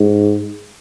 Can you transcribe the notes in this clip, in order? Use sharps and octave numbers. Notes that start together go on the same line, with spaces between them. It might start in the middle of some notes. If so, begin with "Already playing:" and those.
Already playing: G#2